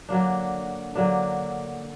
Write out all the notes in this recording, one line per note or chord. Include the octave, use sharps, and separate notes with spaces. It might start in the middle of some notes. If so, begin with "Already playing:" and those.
D3 F#3 A#3 D4
D3 F#3 A#3 D4